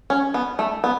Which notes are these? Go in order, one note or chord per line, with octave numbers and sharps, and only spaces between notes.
C#4
B3
A3
B3